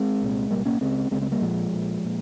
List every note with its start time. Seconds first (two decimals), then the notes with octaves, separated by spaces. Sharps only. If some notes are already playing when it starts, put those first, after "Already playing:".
Already playing: G#3 C4
0.21 C2 A#2
0.51 C2 A#2 G3 A#3
0.65 A#3 C#4
0.81 C#2 C#3 G#3 C4
1.11 C#2 G#3 C4
1.15 C#3
1.22 G#3 C4
1.31 G3 A#3
1.41 A#1 A#2 F3 G#3
1.72 A#1 A#2
2.05 A#2